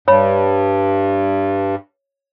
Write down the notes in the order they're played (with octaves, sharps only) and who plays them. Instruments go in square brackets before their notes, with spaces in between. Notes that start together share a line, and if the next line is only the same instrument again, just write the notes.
[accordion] G2 [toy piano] C#5 B5